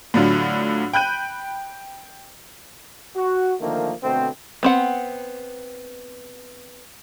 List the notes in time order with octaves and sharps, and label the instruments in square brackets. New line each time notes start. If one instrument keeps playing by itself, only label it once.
[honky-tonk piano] A2 D3 F#3 F4
G5 B5 F#6 G6 D#7
[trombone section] F#4
D3 D#3 F3 A3 A#3
B2 D3 A3 C4
[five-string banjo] B3 C4 F#5